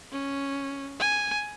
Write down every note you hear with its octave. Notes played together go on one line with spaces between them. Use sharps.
C#4
G#5